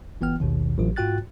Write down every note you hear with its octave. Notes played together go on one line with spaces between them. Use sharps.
G1 E3 B3 G5 F6
A1 D#2 B2 D#3
A1 F#3 F4
G#2 F4 F#4 G5 F#6 A6